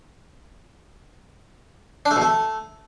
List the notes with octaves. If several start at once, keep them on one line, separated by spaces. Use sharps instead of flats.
D4
A3
B2
A3